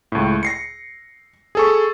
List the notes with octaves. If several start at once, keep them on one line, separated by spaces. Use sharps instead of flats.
C#2 A2
A#6 C7 C#7
G#4 A4 C#6